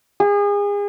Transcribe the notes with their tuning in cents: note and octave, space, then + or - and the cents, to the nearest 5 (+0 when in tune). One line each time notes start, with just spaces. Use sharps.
G#4 -35